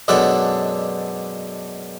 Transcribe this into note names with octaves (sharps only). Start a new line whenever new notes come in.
F#2 B2 G#3 D4 A4 F#5